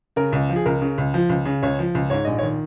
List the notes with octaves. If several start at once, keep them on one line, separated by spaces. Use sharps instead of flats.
C#3 A#4
C#2
F3
G#4
C#2 A#4
C#3
C#2
F3
C#2
C#3
C#2 C#5
F3
C#2
G#2 C#5
A#1 D#5
C#5
D#3